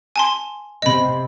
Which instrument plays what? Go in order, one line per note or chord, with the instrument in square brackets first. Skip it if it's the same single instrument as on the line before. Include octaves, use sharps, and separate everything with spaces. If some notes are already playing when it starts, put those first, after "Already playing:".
[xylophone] G#5 A5 C6
[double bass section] C3 C4 [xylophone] D#5 B5